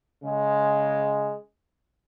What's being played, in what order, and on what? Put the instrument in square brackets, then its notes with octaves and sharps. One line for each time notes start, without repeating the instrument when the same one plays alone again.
[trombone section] C#3 G#3